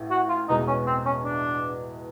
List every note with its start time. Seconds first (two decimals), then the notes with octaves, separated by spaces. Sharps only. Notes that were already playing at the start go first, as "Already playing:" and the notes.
Already playing: A1 A2
0.10 F#4
0.29 F4
0.49 E2 B2 G#3 D#4
0.67 C#4
0.87 C4
1.05 C#4
1.24 D4